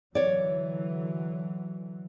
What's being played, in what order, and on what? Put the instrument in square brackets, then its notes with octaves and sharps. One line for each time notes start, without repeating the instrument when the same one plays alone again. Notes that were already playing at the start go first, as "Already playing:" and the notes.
[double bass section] D3 E3 F#3 [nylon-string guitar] C#5 D5